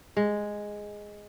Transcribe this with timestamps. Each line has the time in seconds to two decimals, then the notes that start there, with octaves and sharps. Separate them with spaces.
0.17 G#3